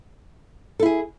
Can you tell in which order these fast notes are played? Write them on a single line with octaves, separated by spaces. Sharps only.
A4 E4 G#4